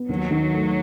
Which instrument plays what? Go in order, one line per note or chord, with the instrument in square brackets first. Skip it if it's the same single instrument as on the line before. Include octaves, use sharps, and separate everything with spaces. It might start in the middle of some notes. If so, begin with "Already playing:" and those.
Already playing: [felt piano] B3
[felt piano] D#2 [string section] F#3
[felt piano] D#3
A3